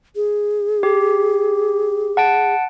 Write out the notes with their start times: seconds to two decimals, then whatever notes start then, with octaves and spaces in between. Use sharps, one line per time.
0.16 G#4
0.83 G4
2.17 F#5 A5 D7